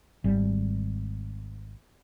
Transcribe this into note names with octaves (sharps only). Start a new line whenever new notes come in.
G#1 G3